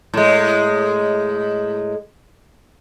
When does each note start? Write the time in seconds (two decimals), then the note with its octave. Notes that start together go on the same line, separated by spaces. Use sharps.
0.14 A2 G#3